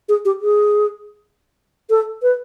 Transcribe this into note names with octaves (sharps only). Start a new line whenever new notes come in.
G#4
G4
G#4
A4
B4